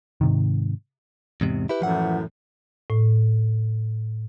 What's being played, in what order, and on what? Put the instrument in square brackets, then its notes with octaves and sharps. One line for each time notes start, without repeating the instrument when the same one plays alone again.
[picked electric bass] G#2 C3 D#3
[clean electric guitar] E2 G#2 C3
E4 G4 B4
[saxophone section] F#2 A2 E3 [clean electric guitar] F3 F#5
[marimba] A2